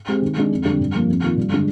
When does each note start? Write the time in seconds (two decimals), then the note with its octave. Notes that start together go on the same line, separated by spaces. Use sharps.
0.08 G#3 C4 G4
0.22 D#3
0.37 G#3 D4
0.51 F2
0.65 D3 G3 D4
0.80 G2
0.95 F3 A#3
1.08 F2
1.23 D#3 A#3 F4
1.37 G2
1.52 D3 G#3 D4